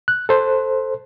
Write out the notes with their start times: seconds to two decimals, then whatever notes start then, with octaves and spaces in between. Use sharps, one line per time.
0.08 F#6
0.29 A4 C5